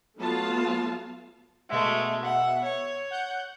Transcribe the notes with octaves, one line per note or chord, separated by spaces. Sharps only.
F#3 A3 B3 F4 F5 A5
B2 G#3 A3 E5
F#5
C#5
F#5 G6